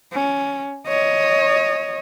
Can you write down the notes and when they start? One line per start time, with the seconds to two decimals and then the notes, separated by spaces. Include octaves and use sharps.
0.13 C#4
0.87 C#5 D#5